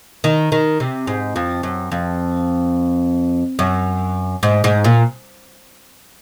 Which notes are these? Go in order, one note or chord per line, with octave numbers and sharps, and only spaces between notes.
D#3
D#3
C3
G#2
F2
F#2
F2
F#2
G#2
G#2
A#2